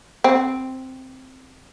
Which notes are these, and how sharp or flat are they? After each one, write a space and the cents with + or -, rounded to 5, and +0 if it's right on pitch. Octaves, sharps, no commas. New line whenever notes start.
C4 +0